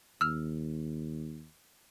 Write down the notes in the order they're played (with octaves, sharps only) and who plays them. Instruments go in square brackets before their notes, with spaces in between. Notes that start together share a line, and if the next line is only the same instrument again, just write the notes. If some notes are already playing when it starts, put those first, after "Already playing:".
[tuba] D#2 [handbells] E6 F6